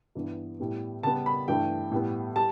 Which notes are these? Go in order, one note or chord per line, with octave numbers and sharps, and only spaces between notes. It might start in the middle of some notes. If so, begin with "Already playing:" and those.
G2 E3 B3
A2 G3 B3
C#3 G3 B3 A5
B5
G2 E3 A3 G5
A2 G3 B3
G3 A5